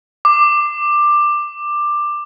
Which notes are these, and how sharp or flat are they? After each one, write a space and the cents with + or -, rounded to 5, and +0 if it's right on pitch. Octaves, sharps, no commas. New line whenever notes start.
D6 +15